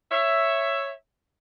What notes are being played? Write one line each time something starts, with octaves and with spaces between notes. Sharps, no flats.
C#5 E5